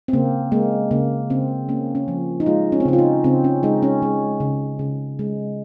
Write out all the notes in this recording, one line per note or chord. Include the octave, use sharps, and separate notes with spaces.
C4
C#3 A#3
G#3 A#3
C#3 A#3
C#3 C4
A#3 C#4
C#4
F3
D#4
G#3 F4
C#4
C4
C#3 C#4
F4
D#4
C#3 C4
C#4
G#3 D#4
C#4
G#3
C#3
C#3
G#3